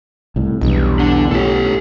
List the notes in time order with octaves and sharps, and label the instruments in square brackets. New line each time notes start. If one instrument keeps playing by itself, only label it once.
[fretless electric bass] C2 A2
[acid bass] B1 [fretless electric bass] E2 G2
[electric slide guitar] D3 D4
[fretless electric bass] A2 C#4 [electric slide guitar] G4 A4